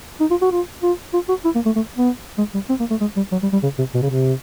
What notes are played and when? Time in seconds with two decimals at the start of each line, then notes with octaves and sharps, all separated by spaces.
0.20 D#4
0.31 F4
0.42 F#4
0.51 F4
0.83 F4
1.14 F4
1.29 F#4
1.45 E4
1.55 A#3
1.65 A3
1.76 A3
1.97 B3
2.38 G#3
2.54 G3
2.69 C4
2.80 A#3
2.90 A3
3.01 G#3
3.16 G3
3.32 F#3
3.42 G3
3.53 G3
3.63 C#3
3.78 C3
3.94 B2
4.02 C#3
4.10 C3